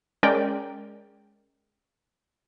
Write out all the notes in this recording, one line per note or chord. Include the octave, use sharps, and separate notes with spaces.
G#3 C#4 A#4 D5 G5